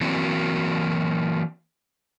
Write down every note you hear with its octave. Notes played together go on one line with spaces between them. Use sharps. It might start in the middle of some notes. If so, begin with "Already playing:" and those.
E3 F#3 A#3 C4 F#4